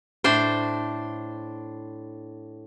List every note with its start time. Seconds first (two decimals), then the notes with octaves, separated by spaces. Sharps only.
0.24 A2 D4 C5